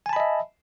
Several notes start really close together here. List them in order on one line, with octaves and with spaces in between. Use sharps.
G#5 A5 B5 D#5 E5